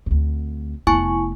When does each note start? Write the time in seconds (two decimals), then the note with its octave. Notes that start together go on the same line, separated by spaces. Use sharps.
0.06 D2 C4
0.87 F1 B3 E4 G#5 C#6